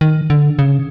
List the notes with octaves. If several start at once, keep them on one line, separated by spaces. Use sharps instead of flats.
D#3
D3
C#3